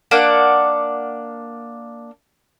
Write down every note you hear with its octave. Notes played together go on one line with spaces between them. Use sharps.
A#3 D4 D5 F#5